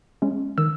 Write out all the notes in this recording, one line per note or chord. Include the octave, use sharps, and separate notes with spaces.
G#3 C#4
D#3 E6